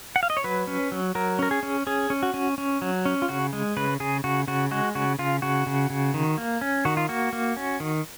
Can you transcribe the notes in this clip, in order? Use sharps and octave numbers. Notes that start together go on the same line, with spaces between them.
F#5
F5
D#5
C#5
F#3 B4
C#4
F#3
F#3 A#4
C#4 A#4
G#4
C#4
C#4 G#4
C#4
F#4
C#4
C#4
F#3
C#4
F4
C#3 F#4
G#3
C#3 B4
C#3 G#4
C#3 F#4
C#3 F#4
G#3 F#4
C#3 F#4
C#3 F4
C#3 F#4
C#3
C#3
D#3
A#3
C#4
D#3 F#4
F4
A#3 F#4
A#3
C#4
D#3